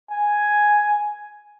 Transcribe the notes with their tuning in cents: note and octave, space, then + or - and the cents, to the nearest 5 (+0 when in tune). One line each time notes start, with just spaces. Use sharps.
G#5 +5